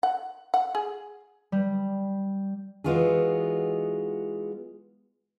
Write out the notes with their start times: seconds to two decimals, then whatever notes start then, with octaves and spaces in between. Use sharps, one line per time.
0.03 F#5
0.54 F#5
0.75 G#4
1.52 G3
2.84 E3 G#3 B3 F4 F#4 G#4